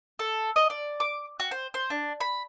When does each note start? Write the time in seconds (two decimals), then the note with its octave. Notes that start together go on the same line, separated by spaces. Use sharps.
0.19 A4
0.56 D#5
0.70 D5
1.00 D6
1.40 F#4
1.51 C5
1.74 C5
1.90 D4
2.20 B5